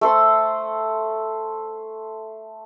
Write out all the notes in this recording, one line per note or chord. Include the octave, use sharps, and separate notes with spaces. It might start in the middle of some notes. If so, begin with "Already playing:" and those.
A3 A4 C5 C6